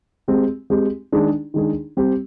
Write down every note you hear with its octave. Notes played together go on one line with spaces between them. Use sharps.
G#3 C4 G4
G#3 C4 G4
D#3 G#3 D4 G#4
D#3 G#3 D4 G#4
G3 C4 G4